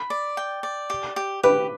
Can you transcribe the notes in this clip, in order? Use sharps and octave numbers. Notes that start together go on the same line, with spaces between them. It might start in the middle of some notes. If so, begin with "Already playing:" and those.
Already playing: B5
D5
G5
D5
G4
G4
G4 B4